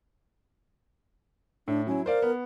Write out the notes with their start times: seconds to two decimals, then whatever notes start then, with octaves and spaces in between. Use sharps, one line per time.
1.68 A2 D4
1.87 F#3 C#4 E4
2.06 A#4 C5 D5 F5
2.22 B3